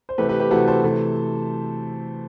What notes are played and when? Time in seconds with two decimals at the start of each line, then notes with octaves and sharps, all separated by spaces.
0.09 C5
0.18 C3 E3 A3 G4 B4
0.29 G4 B4
0.39 G4 B4
0.50 C3 E3 A3 F#4 A4
0.68 A4 C5
0.84 C3 E3 A3